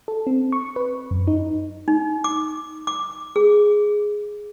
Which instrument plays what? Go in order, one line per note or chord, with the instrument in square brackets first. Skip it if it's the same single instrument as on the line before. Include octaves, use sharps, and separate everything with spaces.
[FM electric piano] A4
C4
C#6
B4
F#2
D#4
[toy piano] D#4
D6
D6
G#4